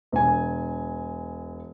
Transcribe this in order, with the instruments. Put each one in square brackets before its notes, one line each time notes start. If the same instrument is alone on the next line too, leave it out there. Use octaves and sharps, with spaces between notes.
[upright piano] E1 G#5